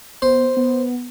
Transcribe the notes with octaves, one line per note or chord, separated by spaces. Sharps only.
B3 C5
B3